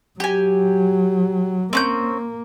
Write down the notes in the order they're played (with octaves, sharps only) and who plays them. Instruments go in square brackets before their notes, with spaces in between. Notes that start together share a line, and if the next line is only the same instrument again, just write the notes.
[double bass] F#3 [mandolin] G4 G#5
[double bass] A#3 [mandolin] C4 C#4 G6